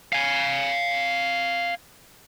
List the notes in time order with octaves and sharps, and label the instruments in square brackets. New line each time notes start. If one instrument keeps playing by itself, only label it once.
[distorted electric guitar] F5 G#5